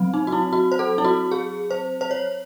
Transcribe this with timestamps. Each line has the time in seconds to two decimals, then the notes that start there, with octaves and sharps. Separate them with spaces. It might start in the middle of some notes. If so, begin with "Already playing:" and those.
Already playing: F#3 C4
0.14 D#4
0.27 F#4
0.32 E4
0.53 F#4
0.72 C5
0.79 A4
0.98 E4
1.05 F#4
1.32 G#4
1.71 C5
2.01 C5
2.11 C#5